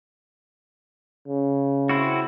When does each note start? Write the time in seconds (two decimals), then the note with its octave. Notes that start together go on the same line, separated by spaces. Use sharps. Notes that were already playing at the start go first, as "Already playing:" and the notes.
1.27 C#3
1.89 C4 E4 F#4